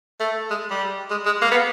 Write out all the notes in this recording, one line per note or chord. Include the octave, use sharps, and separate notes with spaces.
A3
G#3
G3
G#3
G#3
A#3
B3